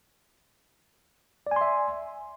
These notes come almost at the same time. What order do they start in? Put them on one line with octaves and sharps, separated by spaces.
D5 G#5 C6 E5